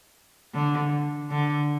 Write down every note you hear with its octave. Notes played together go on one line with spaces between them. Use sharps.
D3
D3